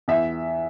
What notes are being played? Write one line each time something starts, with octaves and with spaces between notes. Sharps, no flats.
E2 E5